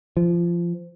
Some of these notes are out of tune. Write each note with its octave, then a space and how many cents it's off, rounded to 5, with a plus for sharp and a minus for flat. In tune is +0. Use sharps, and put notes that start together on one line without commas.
F3 -20